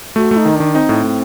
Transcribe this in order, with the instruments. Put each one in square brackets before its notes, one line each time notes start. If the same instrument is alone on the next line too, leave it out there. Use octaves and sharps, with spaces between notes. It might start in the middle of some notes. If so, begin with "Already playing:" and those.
[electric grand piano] A3 [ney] F#4
[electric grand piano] A3 [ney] D#4
[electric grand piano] D#3
[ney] D4
[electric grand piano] D#3
[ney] C4 [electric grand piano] D#4
[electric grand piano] A2
A2